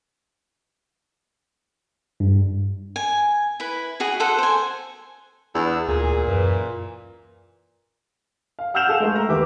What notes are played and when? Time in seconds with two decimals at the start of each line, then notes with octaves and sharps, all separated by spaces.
2.20 G2
2.96 G#5
3.60 E4 B4
4.00 E4 F#4 G#4
4.20 A4 C5 F#5
4.39 C5 G#5
5.55 E2 D4 E6
5.88 D2 A#2 G#4
6.27 F#2 E3
8.59 F5
8.74 F#5 E6 F6 G6 E7 F7
8.88 G#4 A4 F5
9.00 G#3 A3
9.15 A#5
9.28 D#2 D#3 G4 B4 E5 D6